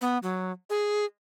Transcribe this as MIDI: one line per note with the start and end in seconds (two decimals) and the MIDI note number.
0.01 0.18 59
0.23 0.51 54
0.70 1.05 68